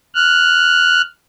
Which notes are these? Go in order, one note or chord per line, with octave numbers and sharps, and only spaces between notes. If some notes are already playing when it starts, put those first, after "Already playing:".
F6 F#6